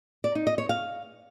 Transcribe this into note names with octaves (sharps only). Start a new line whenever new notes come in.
D5
D#4
D#5
C#5
F5